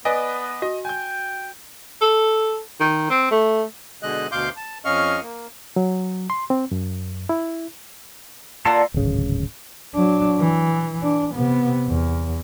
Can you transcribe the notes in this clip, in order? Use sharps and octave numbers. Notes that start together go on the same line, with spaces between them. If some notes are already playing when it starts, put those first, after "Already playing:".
B3 B4 D5 D#5 G#5
F#4 D#5
G5 G#5 G6
A4
D#3
C4
A3
B2 D3 G#3 D#5 F#6
D2 B2 F5 C6 D6 G6
A5
F2 C#4 D#5 F5 C#6 F6
A#3
F#3
C6
C4
F#2
E4
D3 A#3 F4 A4 D5 F#5
D1 G#1 C#3
F#3 D4
E3
D4
C3 B3
E2